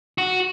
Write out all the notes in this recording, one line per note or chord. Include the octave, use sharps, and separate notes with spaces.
F#4